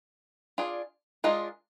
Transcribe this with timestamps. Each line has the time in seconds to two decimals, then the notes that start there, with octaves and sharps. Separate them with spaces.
0.58 D4 F4 G#4 D5
1.24 G#3 D4 F4 A#4 D#5